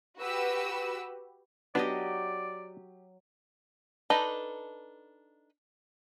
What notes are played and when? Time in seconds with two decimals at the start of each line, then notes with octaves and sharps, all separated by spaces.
0.19 F#4 G4 B4 E6
1.75 F#3 B3 D4 G4 D5 D#5
4.10 D4 D#4 A4 B4 D#5